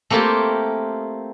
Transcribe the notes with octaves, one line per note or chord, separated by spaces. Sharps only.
A3 A#3 C4 E4 F4 G4